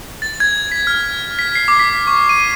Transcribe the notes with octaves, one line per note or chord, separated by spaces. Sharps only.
A6
G#6
B6
F6
B6
C7
D6
B6
C#6
D#7